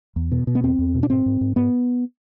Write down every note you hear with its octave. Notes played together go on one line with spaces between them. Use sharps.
E2
B2
B2
B3
E2 C4
E2
B2
D4
G#2 C4
G#2
G#2
G#2 B3